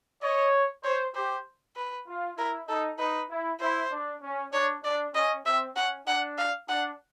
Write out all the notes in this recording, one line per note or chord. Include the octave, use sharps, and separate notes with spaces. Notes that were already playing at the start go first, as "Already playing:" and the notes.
C#5 D#5
C5 C#5
G4 C5
B4
F4
E4 A#4
D#4 A4
D#4 B4
E4
E4 C5
D4
C#4
D4 C#5
D4 D5
C#4 D#5
C4 E5
C#4 F#5
D4 F#5
F5
D4 F#5